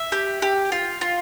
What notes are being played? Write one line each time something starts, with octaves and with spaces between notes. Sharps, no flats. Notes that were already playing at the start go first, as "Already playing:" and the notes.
Already playing: E5
G4
G4
F4
F4